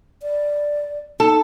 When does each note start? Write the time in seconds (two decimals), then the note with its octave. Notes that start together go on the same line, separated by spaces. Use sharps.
0.23 D5
1.20 D#4 A4